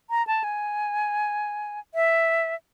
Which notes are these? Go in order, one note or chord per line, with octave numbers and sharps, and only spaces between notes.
A#5
A5
G#5
E5